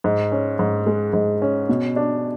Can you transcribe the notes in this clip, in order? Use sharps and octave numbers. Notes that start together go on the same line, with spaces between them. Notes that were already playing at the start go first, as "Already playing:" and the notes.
G#2
C#4
G#2
G#3
G#2
C#4
B2
D4